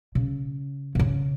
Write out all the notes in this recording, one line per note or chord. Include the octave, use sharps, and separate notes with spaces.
C#3
C3
C#3